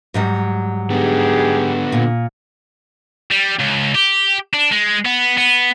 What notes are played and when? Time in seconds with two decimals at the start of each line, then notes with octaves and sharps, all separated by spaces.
0.14 G#2 F#3 G3
0.90 D3 B3 D#4 G4 G#4
1.92 A#2
3.31 G3
3.60 C#2
3.95 G4
4.54 D4
4.72 G#3
5.05 B3
5.38 B3